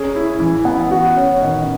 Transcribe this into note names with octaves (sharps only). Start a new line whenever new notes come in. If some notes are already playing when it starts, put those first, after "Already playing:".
Already playing: C#4 G#4
E4
E3
B3
F#4
C#4
D#3